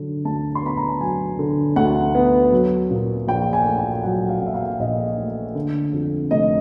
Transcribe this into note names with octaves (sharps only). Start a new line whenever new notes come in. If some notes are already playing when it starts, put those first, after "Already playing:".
Already playing: D3 F#3
D2 A5
C6
B3 B5
A#5
A5
F#3 G#5
D3
D2 F#5
B3
F#3
A#2
A#1 G5
G#5
A3
G5
F#3 F#5
F5
A#2
E5
F5
A#1 D#5
A3
D3
F2
F1 D#5